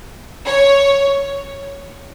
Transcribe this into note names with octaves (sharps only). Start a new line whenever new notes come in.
C#5